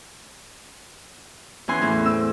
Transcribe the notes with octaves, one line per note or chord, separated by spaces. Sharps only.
E2 C#4 E4 G#5 C6 F#6
E2 A2
C4 E6